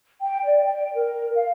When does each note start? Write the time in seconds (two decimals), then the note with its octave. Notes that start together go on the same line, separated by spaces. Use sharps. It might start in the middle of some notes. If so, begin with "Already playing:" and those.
0.21 G5
0.43 D5
0.65 G5
0.95 A#4
1.35 F5